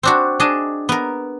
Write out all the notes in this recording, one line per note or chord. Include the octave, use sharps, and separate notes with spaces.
C4 D4 F#4
D4 G#4 D#5 A5
B3 A#4